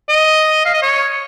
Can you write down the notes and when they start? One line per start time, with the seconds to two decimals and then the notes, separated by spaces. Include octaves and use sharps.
0.09 D#5
0.66 F5
0.74 D#5
0.83 C#5